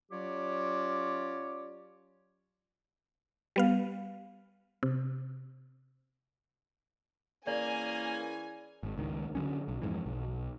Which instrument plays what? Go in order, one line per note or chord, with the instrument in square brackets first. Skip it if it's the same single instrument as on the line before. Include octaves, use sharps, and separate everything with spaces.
[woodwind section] F#3 C#4 F4 G4 C#5 D5
[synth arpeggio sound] G3 B3 F5
C3
[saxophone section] E3 C#4 G#4 [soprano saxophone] A#3 [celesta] D5 [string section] G#5
[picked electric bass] G#1
C#2 D#3
D3 F#3 C#4
B1
F2 G#2 E3
B1